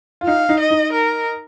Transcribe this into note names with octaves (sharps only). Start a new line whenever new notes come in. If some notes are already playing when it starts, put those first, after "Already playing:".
F4
D#4 F5
D#4
D#5
D#4
A#4